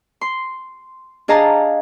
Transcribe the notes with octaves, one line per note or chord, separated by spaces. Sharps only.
C6
D4 G#4 D#5 F5 A5 A#5